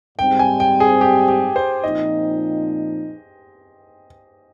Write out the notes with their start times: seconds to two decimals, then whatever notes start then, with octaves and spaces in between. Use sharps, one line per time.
0.18 G#2 G3 C4 G5
0.39 G#5
0.60 G5
0.80 G#4
1.01 G4
1.28 G4
1.56 C5
1.84 A#2 F3 C4 D#4 D#5